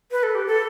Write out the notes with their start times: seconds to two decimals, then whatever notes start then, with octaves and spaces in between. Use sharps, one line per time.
0.11 B4
0.23 A4
0.35 G4
0.46 A4